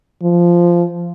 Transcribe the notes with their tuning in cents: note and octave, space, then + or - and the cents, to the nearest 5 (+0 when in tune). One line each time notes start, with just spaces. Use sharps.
F3 -10